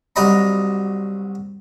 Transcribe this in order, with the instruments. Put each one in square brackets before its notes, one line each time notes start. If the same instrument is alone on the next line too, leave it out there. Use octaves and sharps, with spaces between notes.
[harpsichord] C2 F#3 D5 D#5 A#5 B5